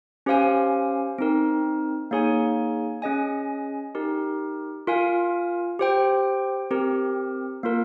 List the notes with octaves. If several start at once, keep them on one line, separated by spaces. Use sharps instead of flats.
C#4 G4 C5 F5 G#5
C4 D#4 A#4
A#3 D#4 G#4 C#5 G#5
C#4 G#4 D#5 G#5
D#4 G4 A#4
F4 A#4 F5 G#5
G4 C5 G5
C4 G4 A#4
A#3 F4 A#4